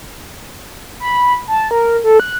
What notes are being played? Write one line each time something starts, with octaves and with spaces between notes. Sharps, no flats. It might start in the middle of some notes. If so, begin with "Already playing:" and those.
B5
A5
A#4
A4
F#6